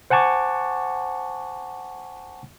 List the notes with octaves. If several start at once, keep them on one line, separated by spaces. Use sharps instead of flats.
C5 F#5 G#5 A5 C#6 D6